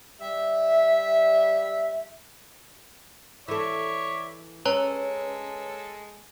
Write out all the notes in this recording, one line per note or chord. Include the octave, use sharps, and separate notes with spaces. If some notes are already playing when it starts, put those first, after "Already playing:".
G3 E5
E3 A4 C#5 D5 E5
G#3 C#4 A4 B4 C#5 A#5